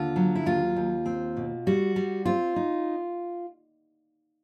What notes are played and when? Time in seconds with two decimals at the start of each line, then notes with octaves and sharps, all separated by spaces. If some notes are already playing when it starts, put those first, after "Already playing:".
Already playing: D#2 D3 F4
0.16 F#3
0.35 E4
0.46 D#2 F4
0.76 D#2
1.06 C4
1.37 B2
1.67 G3 F#4
1.96 G3
2.25 C4 F4
2.56 D#4